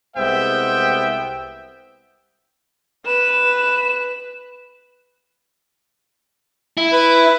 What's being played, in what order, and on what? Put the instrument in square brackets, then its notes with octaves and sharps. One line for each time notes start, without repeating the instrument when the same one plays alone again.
[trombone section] C2 G#3 C5 [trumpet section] B3 E5 G5
[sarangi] B4 [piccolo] E7
[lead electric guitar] E4
[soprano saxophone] B4